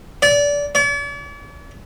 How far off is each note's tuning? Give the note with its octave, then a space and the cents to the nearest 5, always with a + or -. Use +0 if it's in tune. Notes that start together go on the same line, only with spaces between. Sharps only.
D5 -25
D5 -45